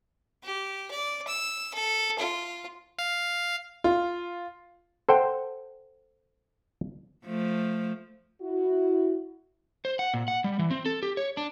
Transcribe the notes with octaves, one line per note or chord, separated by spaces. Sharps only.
G4
D5
E6
A4
F4
F5
F4
A4 C5 F#5 G5
F3 A3
E4 F#4
C5
F#5
A#2
F#5
G3
E3
C4
A4
G4
C#5
D4